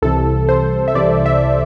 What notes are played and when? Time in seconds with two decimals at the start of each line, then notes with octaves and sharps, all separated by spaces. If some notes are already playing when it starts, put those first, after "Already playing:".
0.02 C2 C3 E3 A4
0.49 C5
0.88 E5
0.94 C2 C3 E3 D5
1.26 E5